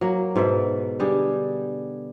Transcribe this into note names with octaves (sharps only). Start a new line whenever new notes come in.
F#3 A#3
G#2 B2 A4 E5
D3 G3 G4 G#4